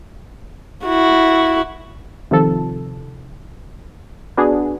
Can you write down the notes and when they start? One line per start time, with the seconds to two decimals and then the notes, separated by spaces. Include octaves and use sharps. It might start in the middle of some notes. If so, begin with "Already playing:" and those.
0.86 E4 F#4
2.31 C3 D#3 F3 A4
4.37 B3 D4 F#4 G#4